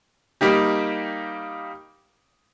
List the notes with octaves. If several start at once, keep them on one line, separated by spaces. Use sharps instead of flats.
G3 A#3 D#4 G4